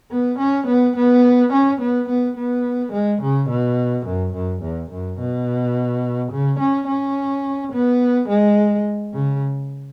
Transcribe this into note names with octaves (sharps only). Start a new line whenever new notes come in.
B3
C#4
B3
B3
C#4
B3
B3
B3
G#3
C#3
B2
F#2
F#2
E2
F#2
B2
C#3
C#4
C#4
B3
G#3
C#3